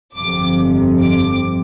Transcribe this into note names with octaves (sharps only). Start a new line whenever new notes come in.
G1 F2 C3 F3 D6
D6